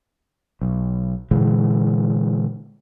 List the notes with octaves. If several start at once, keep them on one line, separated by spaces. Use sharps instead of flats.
B1
A#2 D3 E3 G#3